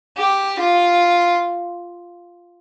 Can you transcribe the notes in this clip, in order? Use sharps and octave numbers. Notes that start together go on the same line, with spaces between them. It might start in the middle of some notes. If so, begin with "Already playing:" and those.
G4
F4